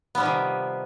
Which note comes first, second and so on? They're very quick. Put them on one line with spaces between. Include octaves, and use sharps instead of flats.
B3 G3 F3 D#3 C3